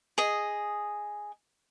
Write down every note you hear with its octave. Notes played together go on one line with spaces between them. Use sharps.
G#4 D#5